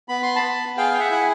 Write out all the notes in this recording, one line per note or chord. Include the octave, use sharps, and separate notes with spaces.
B3 B5
C6
A5 B5
B3
G#4 F5 G5
G5
E5 F#5
E4 F#5